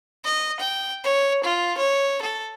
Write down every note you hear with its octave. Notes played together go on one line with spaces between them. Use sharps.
D#5
G5
C#5
F4
C#5
A4